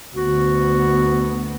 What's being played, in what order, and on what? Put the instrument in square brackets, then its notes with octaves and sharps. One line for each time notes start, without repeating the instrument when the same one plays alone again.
[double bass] D2 B3 [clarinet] F#4